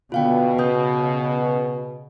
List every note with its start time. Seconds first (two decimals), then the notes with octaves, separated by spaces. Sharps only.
0.12 B2 D3 B3 F4 F5 G5
0.59 C#3 B4 D#6 G6